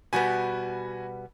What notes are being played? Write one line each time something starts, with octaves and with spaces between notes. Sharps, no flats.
B2 G3 B3 F#4 G#5